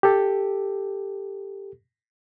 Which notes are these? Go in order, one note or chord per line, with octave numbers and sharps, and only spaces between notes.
G4 A4